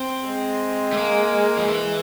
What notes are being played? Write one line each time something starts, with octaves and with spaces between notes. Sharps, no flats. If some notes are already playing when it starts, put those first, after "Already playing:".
Already playing: C4
G#3
A3
A#3
F3
E3